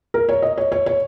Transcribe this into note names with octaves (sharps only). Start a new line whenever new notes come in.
A#4
C#5
D#5
C#5
C#5
C#5